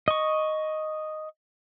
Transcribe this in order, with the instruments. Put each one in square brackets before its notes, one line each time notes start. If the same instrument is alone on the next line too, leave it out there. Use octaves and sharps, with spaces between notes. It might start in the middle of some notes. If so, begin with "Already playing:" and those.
[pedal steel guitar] D#5 C#6